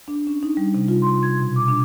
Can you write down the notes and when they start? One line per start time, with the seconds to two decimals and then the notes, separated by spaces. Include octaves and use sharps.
0.08 D4
0.27 C#4
0.43 D#4
0.57 G3
0.74 C3
0.88 F4
1.02 C6
1.23 G#6
1.40 B2
1.56 D6
1.68 D4